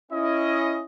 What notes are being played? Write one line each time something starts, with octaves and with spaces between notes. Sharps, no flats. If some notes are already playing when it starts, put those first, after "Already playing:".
C#4 E4 D#5